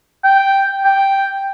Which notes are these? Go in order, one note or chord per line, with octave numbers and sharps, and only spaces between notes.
G5
G5